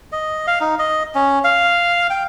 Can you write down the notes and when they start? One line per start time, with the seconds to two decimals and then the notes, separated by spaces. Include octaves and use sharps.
0.12 D#5
0.47 F5
0.61 D#4
0.79 D#5
1.15 C#4
1.44 F5
2.10 G5